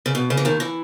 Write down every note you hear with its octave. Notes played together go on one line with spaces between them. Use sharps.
C#3
B2
C#3
E3
D#2 D#3
E3